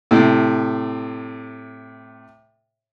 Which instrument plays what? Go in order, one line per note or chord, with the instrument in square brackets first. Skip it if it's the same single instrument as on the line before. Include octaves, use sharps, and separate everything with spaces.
[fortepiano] A2 C3